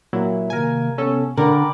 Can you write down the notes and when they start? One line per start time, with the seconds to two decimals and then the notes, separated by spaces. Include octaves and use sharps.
0.13 A#2 F#3 E4
0.50 C3 D#3 A#3 A#4 G#5
0.98 C3 B3 C#4 A4
1.37 D3 A#4 G5 B5 D6